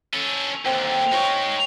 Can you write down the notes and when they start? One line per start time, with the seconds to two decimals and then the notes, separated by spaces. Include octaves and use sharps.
0.14 C#4 A4
0.65 D#2 D3 C4
1.12 G#3 D#4 C5 C#5 F5